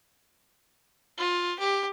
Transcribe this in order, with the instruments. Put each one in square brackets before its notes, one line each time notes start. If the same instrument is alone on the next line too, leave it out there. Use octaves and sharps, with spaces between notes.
[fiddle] F4
G4